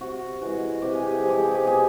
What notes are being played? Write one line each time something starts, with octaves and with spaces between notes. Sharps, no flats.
C3 F#4
E3 G#3 F#4
C3 G4
G#4
G4
F3 G#3 G#4
G4
G#4
G4
B2 G#4